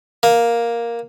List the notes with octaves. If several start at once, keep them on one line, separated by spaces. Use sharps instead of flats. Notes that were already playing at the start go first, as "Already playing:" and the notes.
A#3